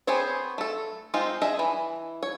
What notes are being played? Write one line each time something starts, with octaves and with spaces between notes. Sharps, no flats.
B3 C4 G#4 C5 C#5
A3 A4
G#3 C4 D#4 F4
D4 G#4 D#5 E5
E3
C#5